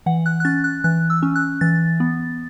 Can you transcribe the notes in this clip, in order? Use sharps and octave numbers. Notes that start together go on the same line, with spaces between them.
E3 F#5
F#6
F#6
C#4 A6
F#6
E3 F#6
E6
C#4
F#6
E3 A6
B3